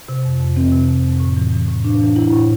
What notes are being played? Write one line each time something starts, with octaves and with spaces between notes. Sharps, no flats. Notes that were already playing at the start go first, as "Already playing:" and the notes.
C3
F2
F2
E3 C4
C3
F2
F2
A2
E3
E3
A2
A2 D4
E3
E3 E4
A2